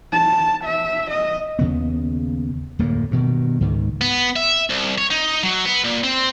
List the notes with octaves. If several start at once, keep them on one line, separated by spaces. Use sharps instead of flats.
A5
E5
D#5
D#2 C#3 B3
D1 F2 A2 A#3
G2 B2 D#3
C#2 G#2 D#3
B3
E5
C2
C#5
D#4
F#3
B3
A#2
C4